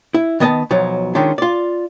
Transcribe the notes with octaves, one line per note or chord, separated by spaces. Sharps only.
E4
D#3 B3 D#5 G#5 A5
B1 F3 F#3
D#3 G#3 C#4 D4 F4
F4 D5